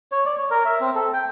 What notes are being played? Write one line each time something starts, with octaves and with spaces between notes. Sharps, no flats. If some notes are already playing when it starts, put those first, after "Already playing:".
C#5
D5
C#5
A#4
E5
C4
A4
G5